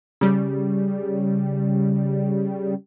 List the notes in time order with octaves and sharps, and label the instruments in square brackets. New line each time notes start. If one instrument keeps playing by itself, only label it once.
[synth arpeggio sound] C#3 G3